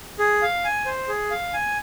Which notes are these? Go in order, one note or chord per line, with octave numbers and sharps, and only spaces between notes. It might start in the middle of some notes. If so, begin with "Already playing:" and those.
G#4
F5
G#5
C5
G#4
F5
G#5